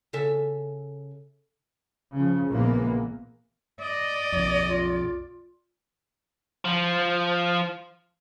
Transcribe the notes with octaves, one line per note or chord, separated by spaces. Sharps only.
C#3 A4 E5
C#3 F3
A#1 A#2 E3 G#3 A#3 B3
D5 D#5
B1 F2
F4
F3